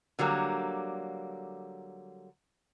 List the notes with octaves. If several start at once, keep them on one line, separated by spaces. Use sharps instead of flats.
D3 F#3 G3 A#3